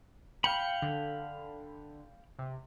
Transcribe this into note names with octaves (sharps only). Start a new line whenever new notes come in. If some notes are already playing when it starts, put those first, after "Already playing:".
F5 G5 B5 C#7
D3
C3